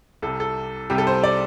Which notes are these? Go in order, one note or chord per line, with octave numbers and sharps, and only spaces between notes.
C2 C3 G3 A4
A4
C2 C3 G3 G4
A4
C5
D5